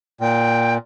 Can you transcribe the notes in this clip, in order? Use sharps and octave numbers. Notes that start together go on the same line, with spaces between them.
A#2 G5